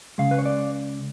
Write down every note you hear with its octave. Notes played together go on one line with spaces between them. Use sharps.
C#2 C#3 G#3 F5
B4
C#5
D5